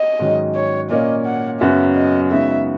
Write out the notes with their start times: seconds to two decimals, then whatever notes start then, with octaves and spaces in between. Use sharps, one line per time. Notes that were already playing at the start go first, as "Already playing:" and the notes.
Already playing: D#5
0.19 G#2 D#3 F#3 C#4
0.55 C#5
0.90 A#2 A#3 C#4 D#5
1.25 F#5
1.60 F#2 C#3 F#3 B3 F#4 E5
1.96 D#5
2.31 C#3 G#3 B3 D#4 F#4 E5